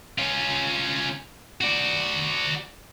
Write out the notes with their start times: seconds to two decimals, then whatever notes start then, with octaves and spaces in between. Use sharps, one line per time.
0.18 C#4 F4
1.61 F#4 D5